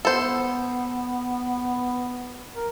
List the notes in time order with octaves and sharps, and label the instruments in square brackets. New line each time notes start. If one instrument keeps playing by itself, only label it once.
[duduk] B3 [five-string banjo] A4 C5
[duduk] A#4